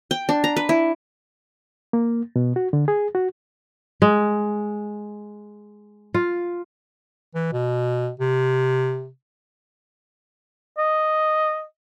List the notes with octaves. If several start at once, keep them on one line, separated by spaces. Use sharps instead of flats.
G5
D4
A#5
B4
E4
A#3
B2
F#4
D3
G#4
F#4
G#3
F4
E3
B2
C3
D#5